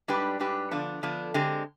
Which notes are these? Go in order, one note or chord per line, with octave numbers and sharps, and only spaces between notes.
G#2 G3 D4 G4 B4
G#2 G3 D4 G4 B4
D3 F3 B3 D4
D3 F3 B3 D4
D3 G#3 C4 G4